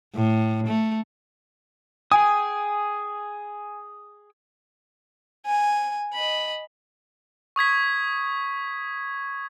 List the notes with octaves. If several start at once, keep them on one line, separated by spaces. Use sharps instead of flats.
A2
A3
G#4 G5 G#5 D#6
G#5
D#5 B5
C#6 D#6 G#6 B6